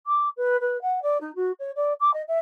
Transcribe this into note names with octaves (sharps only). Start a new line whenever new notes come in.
D6
B4
B4
F#5
D5
D#4
F#4
C#5
D5
D6
D#5
E5